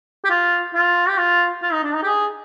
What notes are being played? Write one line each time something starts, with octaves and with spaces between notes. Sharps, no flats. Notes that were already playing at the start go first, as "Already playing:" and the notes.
G4
F4
F4
G4
F4
F4
D#4
D4
D#4
G4
G#4